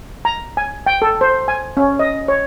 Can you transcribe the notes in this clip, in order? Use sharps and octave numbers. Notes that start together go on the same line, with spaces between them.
A#5
G#5
G5
A4
C5
G#5
C#4
D#5
C#5